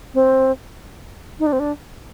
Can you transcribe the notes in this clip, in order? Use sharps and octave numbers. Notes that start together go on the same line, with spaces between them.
C4
D#4
D4
C4
D4